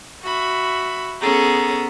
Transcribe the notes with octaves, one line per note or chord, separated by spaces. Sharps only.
F#4 E5 B5
B3 C#4 G#4 A4 A#5